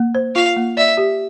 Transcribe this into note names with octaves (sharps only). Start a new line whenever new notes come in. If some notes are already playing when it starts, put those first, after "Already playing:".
Already playing: A#3
C5
F4 F5
A#3
D5 E5
G4